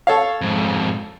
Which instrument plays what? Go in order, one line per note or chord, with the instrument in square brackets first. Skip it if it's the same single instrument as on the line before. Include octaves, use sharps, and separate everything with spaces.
[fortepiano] A4 C#5 F5
[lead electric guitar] F2 G#2